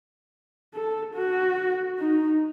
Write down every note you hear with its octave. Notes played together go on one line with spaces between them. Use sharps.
A4
F#4
D#4